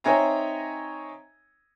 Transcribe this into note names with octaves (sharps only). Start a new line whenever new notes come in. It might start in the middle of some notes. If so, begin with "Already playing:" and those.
C4 D#4 C#5 E5 G#5 A#5